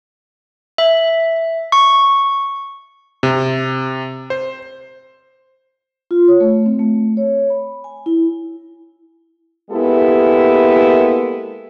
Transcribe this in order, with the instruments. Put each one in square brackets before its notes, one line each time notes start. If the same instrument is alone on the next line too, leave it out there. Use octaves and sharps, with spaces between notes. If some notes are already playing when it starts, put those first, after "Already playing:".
[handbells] E5
C#6
[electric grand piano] C3
C5
[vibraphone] F4
C#5
A3
C4
A3
C#5
B5
G#5
E4
[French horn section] G#3 A#3 B3 E4 G4 A4